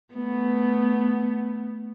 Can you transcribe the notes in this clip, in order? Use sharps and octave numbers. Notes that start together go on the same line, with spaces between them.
A3 B3